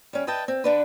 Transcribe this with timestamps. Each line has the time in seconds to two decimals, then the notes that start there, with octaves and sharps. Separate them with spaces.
0.13 G3 C#4
0.27 B4 D#5 E5 G5 A5
0.48 C4
0.64 D3 D4 B4